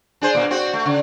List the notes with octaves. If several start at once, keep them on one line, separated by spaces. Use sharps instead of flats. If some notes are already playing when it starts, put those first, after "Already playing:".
D4 G#4 C5
A#2 A#3
C4 F#4
A3
C#3